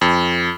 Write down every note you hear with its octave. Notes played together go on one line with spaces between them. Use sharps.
F2